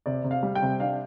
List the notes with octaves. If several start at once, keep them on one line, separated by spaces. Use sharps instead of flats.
C3 D5
C3
F5
G3
G5
C3
D4 F5